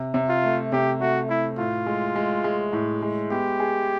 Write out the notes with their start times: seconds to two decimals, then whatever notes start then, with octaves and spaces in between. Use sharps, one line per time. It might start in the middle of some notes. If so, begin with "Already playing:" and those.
Already playing: C3
0.14 C3
0.29 F4
0.43 A3
0.72 C3 G4
1.01 A3 F#4
1.29 A3 E4
1.58 A2 F4
1.86 G#3
2.16 G#3
2.44 G#3
2.73 A2
3.02 G#3
3.30 B3 G4
3.60 G#4